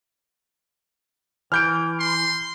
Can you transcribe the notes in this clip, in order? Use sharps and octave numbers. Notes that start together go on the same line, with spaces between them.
E3 F6 G6 D7
C6